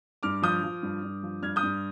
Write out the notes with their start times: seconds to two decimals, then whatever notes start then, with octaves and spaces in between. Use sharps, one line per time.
0.23 G2 D6 F6
0.42 F3 D#6 G6
0.63 F3
0.83 G2
1.03 G2
1.23 F3
1.43 G2 F6 G#6
1.56 D#6 G6
1.63 G2